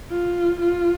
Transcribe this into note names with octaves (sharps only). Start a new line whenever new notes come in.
F4
F4